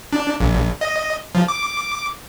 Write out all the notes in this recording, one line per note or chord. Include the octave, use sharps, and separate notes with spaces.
D4
A#1
D#5
F3
D6